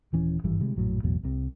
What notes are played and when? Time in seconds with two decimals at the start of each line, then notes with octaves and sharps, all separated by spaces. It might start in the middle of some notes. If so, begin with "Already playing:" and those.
0.13 D#1 E3 C#4
0.44 G#1 G2 E3 G3
0.60 C3 D#3 G3 G#3
0.76 A#1 F#2 A2 F#3
1.03 A1 E2 B2 F#3
1.23 C2 C3